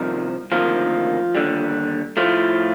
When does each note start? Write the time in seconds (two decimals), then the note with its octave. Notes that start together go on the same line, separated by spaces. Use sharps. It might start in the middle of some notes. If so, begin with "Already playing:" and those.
Already playing: C2 C3 D#3 F3 D#4
0.52 D2 C3 D#3 F3 A#3 F4
1.35 D#2 D3 G3
2.17 A2 F3 A3 F4